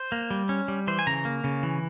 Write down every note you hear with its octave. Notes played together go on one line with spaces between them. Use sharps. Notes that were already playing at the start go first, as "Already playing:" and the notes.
Already playing: C5
A#3
G3
C#4
G3
E3 C5
G#5
C#3 A#5
A#3
C#3
E3